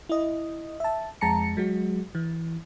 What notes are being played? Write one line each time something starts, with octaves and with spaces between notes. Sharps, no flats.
E4 D#5
E5 A5
F2 G#3 A5 A#5 C#7
F#3 G#3 F#4
E3